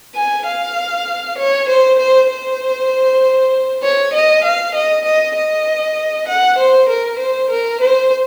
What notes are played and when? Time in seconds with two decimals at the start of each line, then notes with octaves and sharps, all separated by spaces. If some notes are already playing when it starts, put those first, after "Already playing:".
0.15 G#5
0.46 F5
1.38 C#5
1.68 C5
1.99 C5
2.30 C5
3.83 C#5
4.13 D#5
4.44 F5
4.74 D#5
5.05 D#5
5.36 D#5
6.28 F#5
6.58 C5
6.89 A#4
7.19 C5
7.50 A#4
7.81 C5